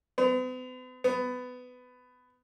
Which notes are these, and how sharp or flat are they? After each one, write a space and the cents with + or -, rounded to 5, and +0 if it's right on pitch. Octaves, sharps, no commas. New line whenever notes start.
B3 +45
B3 +20